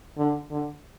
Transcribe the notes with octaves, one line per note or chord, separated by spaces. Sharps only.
D3
D3